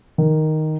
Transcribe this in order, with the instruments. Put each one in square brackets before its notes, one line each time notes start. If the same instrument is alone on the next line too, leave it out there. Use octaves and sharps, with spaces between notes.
[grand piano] D#3